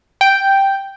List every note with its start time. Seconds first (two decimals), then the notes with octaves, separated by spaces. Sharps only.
0.21 G5